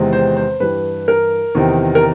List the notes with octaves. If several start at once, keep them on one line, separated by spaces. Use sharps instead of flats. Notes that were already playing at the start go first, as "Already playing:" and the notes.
Already playing: E2 C3 D#3 G#3 C4
C5
C5
G2 E3 G3 B4
A#4
E2 C3 D#3
A#4